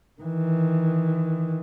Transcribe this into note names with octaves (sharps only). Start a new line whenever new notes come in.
D#3 E3